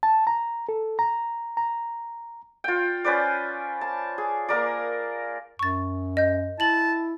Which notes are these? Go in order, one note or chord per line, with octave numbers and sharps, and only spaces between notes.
A5
A#5
A4
A#5
A#5
F4 G5
C#4 B4 C5 D5
A5
G#4
A#3 A#4 D5
F#2 C#6 A6
D#5 G6
E4 A5 A6 F#7